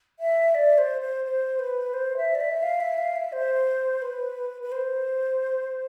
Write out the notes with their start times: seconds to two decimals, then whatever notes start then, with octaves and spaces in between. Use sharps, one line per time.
0.20 E5
0.55 D5
0.78 C5
1.01 C5
1.25 C5
1.59 B4
1.94 C5
2.17 E5
2.35 D5
2.40 E5
2.63 F5
2.80 E5
2.98 F5
3.16 E5
3.32 C5
4.02 B4
4.62 B4
4.72 C5